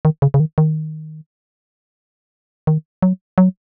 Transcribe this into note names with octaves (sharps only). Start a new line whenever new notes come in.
D#3
C#3
C#3
D#3
D#3
D#3
F#3
F#3